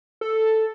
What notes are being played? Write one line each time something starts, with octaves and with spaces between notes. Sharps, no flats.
A4